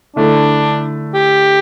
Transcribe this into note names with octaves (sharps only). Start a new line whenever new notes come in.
D3 A3 D4 E4
G4